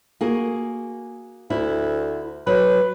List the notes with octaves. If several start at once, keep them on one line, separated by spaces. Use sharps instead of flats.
A#3 F#4 G#4
D2 E4
F#3 B4